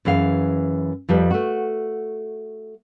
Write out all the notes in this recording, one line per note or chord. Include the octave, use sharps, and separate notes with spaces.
F#2 E3 G#4 F5
F2 F3 G3 B4
A3 F#4